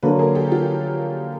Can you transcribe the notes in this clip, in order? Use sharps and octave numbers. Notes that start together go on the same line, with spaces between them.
D3 F#3 A#3 A4 B4
G#4 A#4
G4 A4
F4 G4